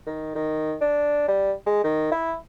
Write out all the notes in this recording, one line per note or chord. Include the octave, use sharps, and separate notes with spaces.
D#3
D#3
D4
G3
G#3
D#3
E4